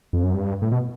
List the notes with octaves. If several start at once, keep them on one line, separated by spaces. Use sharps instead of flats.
F2
F#2
G2
A2
B2